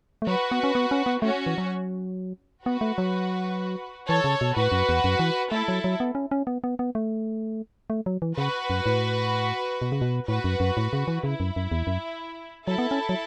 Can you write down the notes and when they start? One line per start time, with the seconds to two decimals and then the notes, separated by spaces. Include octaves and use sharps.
0.22 A3
0.27 F#3 F#4 B4
0.51 B3
0.63 C#4
0.75 B3
0.91 C#4
1.06 B3
1.22 A3 C#4 F#4
1.46 E3
1.58 F#3
2.66 B3 F#4 B4
2.81 A3
2.98 F#3
4.08 E3 A4 C#5
4.24 C#3
4.41 B2
4.56 A2 F#4 B4
4.72 F#2
4.89 E2
5.04 F#2
5.19 E3
5.52 A3 E4 A4
5.68 F#3
5.84 F#3
6.00 B3
6.15 C#4
6.31 C#4
6.47 B3
6.64 B3
6.79 B3
6.95 A3
7.90 A3
8.06 F#3
8.22 E3
8.38 C#3 F#4 B4
8.70 F#2
8.86 A2
9.82 B2
9.92 C#3
10.01 B2
10.28 A2 F#4 B4
10.44 F#2
10.60 F#2
10.77 A2
10.93 C#3
11.08 E3
11.24 C#3 E4
11.40 F#2
11.56 F#2
11.72 E2
11.87 F#2
12.66 F#3 E4 A4
12.78 B3
12.91 C#4
13.09 F#3